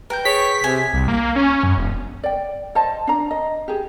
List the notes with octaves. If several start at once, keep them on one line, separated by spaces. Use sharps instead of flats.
A#4 B4 G5 G6
G#4 C#5 B6
C3 G#5
C2
A#3
C#4
F#2
E1
D5 G5
C5 D#5 A5
D4 A#5
D#5
G4 G#4